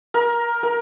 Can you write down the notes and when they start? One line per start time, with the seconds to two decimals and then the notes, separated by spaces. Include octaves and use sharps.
0.14 A#4
0.63 A#4